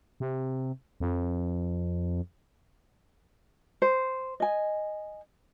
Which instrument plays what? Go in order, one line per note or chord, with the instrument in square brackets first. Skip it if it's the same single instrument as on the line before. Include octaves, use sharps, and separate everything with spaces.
[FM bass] C3
F2
[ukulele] C5
D#5 G#5